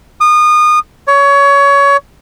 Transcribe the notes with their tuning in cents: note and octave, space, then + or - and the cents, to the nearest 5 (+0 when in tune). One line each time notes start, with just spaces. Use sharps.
D#6 -30
C#5 +20